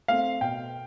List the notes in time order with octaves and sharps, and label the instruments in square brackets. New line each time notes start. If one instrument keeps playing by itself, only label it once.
[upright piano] A3 C4 F5
B2 G5